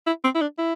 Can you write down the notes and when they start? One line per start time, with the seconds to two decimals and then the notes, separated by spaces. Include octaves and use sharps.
0.07 E4
0.24 C4
0.35 E4
0.41 D4
0.58 E4